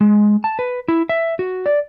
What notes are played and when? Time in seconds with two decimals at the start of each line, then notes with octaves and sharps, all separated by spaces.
0.01 G#3
0.44 A5
0.59 B4
0.88 E4
1.09 E5
1.39 F#4
1.66 D5